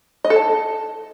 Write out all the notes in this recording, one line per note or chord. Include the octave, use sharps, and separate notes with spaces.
D#5
A4
A5